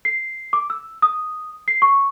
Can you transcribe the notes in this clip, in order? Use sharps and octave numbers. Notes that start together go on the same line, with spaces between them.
C7
D6
E6
D#6
C7
C#6